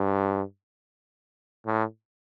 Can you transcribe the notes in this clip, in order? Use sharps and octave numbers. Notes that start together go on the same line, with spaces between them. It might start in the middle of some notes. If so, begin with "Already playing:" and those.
Already playing: G2
A2